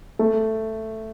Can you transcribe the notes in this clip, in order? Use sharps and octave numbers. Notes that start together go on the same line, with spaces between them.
A3